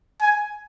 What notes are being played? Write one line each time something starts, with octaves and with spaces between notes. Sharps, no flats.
G#5